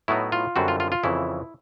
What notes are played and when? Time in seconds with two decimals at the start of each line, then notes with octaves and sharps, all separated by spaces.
0.08 A2 F#3 B3 D#4 E4
0.32 F4
0.56 F#2 D3 G3 C4 F#4
0.68 F4
0.80 F4
0.92 F4
1.04 F2 C#3 E3 E4